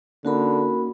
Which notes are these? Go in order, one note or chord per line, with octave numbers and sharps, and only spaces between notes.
D3 A#3 C#4 D#4 F#4 A#4 B5